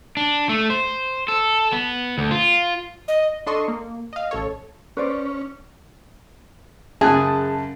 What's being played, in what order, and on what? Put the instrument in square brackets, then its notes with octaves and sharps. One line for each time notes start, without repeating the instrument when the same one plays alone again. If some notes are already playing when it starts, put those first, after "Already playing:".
[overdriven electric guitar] D4
A3
C5
A4
B3
D2
F4
[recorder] D#5
[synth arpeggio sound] D4 A4 D#5 C6 C#6
A#3
D#5 F5
A1 A4 C#5
[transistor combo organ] C#4 [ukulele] B4 C5 D5
[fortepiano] F#2 C#3 [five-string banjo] G#4 [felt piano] A5 F#6